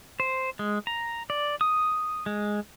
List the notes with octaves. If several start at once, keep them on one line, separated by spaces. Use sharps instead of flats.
C5
G#3
A#5
D5
D#6
G#3